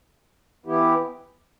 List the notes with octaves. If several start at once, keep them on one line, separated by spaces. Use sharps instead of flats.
E3 B3 E4 G4